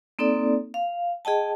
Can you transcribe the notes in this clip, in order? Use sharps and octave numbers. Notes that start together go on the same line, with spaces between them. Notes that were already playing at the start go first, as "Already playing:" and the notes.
A#3 C4 D#4 A4 D5
F5
G#4 D#5 G5 A5